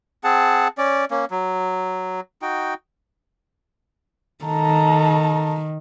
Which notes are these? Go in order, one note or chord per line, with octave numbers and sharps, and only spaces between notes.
C4 G#4 F#5 A5
C#4 D5
A#3 C#4
F#3
D#4 F#4 G5
D#3 A4 A#5